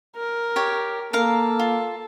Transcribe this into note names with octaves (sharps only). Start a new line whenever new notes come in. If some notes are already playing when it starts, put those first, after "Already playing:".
A#4
G4 C#5
A#3 A4 A#4 F5 A#5
F4